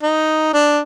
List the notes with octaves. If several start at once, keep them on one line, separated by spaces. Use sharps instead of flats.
D#4
D4